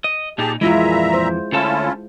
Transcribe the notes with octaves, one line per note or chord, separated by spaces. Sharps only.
D#5
A#2 D#4 G4 G#4 A5
F2 A#2 E3 G#3 E4 F4 E5 A#5
C5
D2 C#4 E4 F4 A4 A5